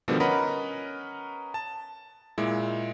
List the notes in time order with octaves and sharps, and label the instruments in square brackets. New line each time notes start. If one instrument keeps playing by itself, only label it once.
[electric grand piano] B2 D3 D#3 F3 G3 B3
C#4 A#4 B4 D#5 F#5 B5
A5
A#2 G#3 E4